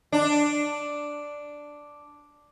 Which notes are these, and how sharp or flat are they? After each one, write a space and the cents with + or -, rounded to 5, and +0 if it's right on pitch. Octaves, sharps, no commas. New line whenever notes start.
D4 +0